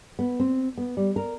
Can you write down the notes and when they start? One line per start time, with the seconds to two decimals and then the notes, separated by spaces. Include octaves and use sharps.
0.19 B3
0.40 C4
0.77 B3
0.97 G3
1.16 A#4